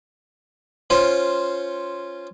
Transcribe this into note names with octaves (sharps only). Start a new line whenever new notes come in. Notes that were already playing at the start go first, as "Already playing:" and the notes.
C#4 F4 C5